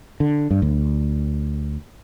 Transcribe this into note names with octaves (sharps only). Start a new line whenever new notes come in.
D3
G2
D2